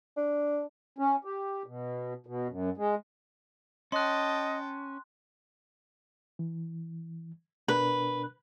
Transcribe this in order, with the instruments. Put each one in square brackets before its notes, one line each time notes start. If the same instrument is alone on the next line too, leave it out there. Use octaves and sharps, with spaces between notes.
[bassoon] D4
[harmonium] C#4
G4
B2
B2
F#2
G#3
[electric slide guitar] C#4 [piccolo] D#5 [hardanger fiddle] G5 A5 [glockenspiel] C6 F#6
[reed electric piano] E3
[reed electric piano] B2 D4 A#4 [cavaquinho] B4